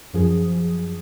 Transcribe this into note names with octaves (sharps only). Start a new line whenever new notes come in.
F#2 F3 G#4